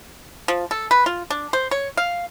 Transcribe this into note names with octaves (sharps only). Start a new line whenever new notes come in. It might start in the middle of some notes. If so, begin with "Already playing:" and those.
F3
A4
B4
F4
D4
C5
C#5
F5